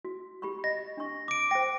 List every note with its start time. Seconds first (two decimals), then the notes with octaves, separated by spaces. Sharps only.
0.05 F#4
0.42 G4 B5 C#6
0.64 D#5 A#6
0.97 D4 C#6
1.28 D6 D7
1.51 C5 G5 A#6